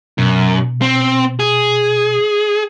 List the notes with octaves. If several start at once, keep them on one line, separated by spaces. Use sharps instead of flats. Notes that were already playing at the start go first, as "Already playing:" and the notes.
F#2 B2
C4
G#4